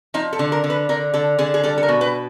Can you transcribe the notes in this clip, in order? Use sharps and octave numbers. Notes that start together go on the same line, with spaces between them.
F3 D#4
A4
D3
A#4
D3
B4
D3 A#4
D3 A4
D3 G#4
G#4
G3 A4
A4
A#4
B2
B4